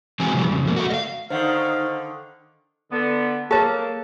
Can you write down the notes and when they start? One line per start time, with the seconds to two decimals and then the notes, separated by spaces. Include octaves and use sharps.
0.20 E3 F#3 G#3 C4 G#5
0.33 C3 E3 F3 G3
0.50 F2 C#3
0.65 F2 B2 A#3
0.76 A3 F#4
0.90 D#5 F5
1.30 D3 D#3 D#4 C5 F5 F#5
2.92 D3 B3
3.51 A#3 G#4 A4 C#5 A5